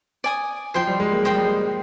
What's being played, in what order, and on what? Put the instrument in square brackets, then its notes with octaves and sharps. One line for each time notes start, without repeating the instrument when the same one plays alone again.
[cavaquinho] D5 G#5 D#6
[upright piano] F3 [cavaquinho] C5 D#5 G5 C6
[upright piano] G3
G#3
A#3
[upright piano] G#3 [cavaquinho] C5 D#5 G5 C6
[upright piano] G3
G#3